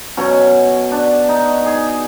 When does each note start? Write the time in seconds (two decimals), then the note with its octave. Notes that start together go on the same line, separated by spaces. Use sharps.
0.17 B2 F#3 C#4
0.92 D4
1.29 D#4
1.66 G#4